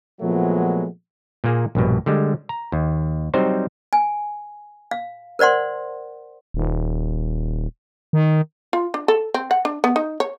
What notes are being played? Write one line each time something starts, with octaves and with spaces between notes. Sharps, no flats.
A#2 F3 F#3 G#3 A3 B3
A#2 A#3 G#4
A#1 G2 B2
D3 G3 G#3
A#5
D#2
F#3 G3 C4 D#4 C5
G#5
F5
A#4 C5 D5 F#5 C6
D#1
D#3
F4
D4
A4
C4
F#5
D4
B3
D#4
C#5